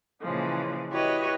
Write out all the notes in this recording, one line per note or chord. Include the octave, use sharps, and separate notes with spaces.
A#2 C#3 E3 F3 G#3
E4 F#4 G4 B4 C#5 D#5